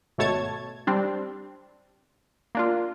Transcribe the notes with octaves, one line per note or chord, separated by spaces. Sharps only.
G#1 B2 A3 C#5 A5 G#6
G3 C4 D4
A#3 D4 F4